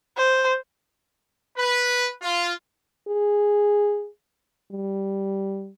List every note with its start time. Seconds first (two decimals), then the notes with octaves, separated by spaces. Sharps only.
0.17 C5
1.58 B4
2.22 F4
3.07 G#4
4.71 G3